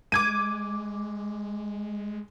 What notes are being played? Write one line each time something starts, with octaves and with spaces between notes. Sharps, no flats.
G#3 D6 G#6 D#7